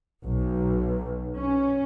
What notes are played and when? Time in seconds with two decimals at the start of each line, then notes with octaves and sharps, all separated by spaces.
0.23 B1
1.36 C#4